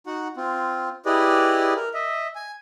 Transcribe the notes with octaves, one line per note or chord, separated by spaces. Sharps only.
D#4 F#4 F#5
C4 F4
E4 G4 G#4 B4 D5 D#5
A#4
D#5 E5
G#5